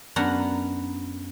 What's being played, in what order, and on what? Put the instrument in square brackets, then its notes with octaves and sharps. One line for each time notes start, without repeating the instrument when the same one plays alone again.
[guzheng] F#2 B3 D4 F#5 A#5